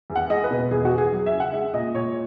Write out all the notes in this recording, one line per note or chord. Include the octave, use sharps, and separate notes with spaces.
E2
F#5
G#3 D#5
B4
B2
E2 G#4
F#4
E2
G#4
F#3
E5
C#3
F#5
G#3 E5
A#2 D#5
A#2 C#5